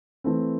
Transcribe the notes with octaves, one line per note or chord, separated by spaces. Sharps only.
E3 A3 C4